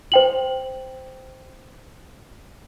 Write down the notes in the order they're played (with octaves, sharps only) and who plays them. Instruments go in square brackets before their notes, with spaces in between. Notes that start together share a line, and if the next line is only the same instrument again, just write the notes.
[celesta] C5 G5 F#7